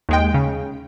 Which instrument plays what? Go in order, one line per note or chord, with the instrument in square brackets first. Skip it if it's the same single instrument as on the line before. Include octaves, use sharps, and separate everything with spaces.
[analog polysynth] D#2 G#3 G5
C#3